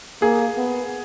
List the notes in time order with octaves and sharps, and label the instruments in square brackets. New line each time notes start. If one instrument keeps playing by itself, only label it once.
[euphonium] A#3 [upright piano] G#4
[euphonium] B3